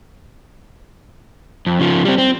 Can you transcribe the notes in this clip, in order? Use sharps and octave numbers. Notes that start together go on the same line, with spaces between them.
F2
C#3 F3
G3 C4
C4